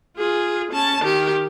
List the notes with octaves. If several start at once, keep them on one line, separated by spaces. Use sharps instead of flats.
F4 G#4
C#4 A5
D#3 G4